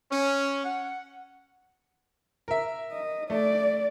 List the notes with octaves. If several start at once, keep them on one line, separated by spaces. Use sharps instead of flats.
C#4
F#5
A#4 E5
D#5
A3 D5